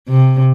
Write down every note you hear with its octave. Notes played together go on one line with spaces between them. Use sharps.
C3